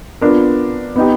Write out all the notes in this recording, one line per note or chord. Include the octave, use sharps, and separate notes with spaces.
B3 D4 F4 A#4
B3 D#4 G4